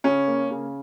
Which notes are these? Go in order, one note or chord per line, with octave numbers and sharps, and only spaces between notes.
C#3 C#4
A#3
C#3